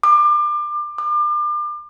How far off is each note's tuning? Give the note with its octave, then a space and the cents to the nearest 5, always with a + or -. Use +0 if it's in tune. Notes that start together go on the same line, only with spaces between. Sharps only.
D6 +30
D6 +35